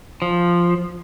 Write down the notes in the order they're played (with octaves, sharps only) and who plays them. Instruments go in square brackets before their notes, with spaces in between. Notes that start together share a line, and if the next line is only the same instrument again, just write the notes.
[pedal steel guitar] F3